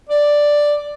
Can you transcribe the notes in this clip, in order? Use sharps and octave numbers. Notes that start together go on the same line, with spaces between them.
D5